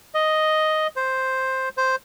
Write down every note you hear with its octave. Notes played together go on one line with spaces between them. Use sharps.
D#5
C5
C5